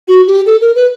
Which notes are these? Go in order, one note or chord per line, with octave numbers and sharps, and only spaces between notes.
F#4
G4
A4
A#4
B4